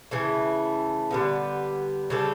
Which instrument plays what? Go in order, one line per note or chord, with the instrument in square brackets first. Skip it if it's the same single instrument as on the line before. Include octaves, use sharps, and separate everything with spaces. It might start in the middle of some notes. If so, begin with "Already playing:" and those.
[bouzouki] C#3 E3 A3
D3 G3 B3
C#3 G3 D4 A4